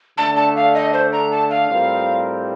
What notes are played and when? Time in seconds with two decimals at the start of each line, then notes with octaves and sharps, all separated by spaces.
0.18 D3 A3 D4 A5
0.36 A5
0.56 F5
0.74 D#5
0.93 C5
1.12 A#5
1.31 A5
1.50 F5
1.69 A2 G3 C4 F4 A#4